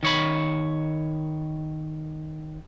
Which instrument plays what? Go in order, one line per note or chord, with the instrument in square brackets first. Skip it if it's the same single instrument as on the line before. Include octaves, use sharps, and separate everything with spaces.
[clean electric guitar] D#3 C#5 B5